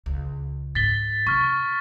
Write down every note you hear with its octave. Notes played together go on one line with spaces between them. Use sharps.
C#2
G#2 A6 B6 G7
C3 C#6 F6